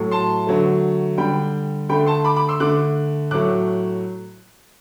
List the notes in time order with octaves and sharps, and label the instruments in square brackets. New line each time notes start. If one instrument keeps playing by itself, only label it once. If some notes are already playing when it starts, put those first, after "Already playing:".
Already playing: [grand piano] A2 F#3 A3
A5 C6
D3 F#3 A3
D3 G3 G5 B5
D3 G5 B5
A3
A5 C6
B5 D6
B5 D6
C6 E6
D3 A3 D6 F#6
A2 F#3 A3 D6 F#6